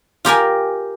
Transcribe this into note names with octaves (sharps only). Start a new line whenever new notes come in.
F4 G4 A#4 G#5